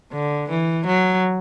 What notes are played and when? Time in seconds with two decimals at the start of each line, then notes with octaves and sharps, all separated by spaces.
0.12 D3
0.49 E3
0.87 F#3